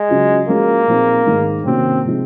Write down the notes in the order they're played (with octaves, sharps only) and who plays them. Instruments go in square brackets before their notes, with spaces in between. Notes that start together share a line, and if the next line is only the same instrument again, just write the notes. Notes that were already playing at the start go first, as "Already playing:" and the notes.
Already playing: [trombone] G#3
[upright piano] C#3 F#3 C#4 F4
[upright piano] F3 G#3 C#4 F#4 [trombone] A#3
[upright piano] A#2 F3 C4 D#4 G#4
G#2 D#3 G#3 D#4
[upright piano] C3 D#3 A#3 C#4 F#4 [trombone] C4
[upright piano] C3 F3 G#3 D#4